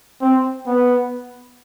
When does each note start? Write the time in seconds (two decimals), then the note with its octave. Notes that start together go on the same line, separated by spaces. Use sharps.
0.21 C4
0.66 B3